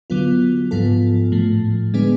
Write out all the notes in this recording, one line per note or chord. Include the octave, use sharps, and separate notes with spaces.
D3 F#3 B3 F4
G#2 F3 B3 F4 A4
A2 F3 A3
D3 G#3 B3 D4 G#4